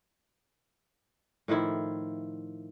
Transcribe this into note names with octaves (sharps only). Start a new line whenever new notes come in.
A2 D#3 F3 E4